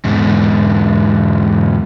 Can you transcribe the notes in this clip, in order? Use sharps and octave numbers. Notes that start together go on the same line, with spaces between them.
E2 G#2